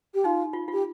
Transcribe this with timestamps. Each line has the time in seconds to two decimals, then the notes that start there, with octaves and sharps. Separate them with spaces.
0.14 G4
0.24 D#4 F4
0.53 F4
0.68 F4
0.72 G4